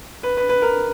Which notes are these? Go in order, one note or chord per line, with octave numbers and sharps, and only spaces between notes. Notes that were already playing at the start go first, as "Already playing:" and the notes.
B4
B4
B4
A#4